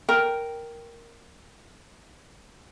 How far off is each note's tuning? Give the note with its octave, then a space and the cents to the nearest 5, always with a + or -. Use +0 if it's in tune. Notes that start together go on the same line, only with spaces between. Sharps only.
A#4 +0 G5 +0 A#5 +0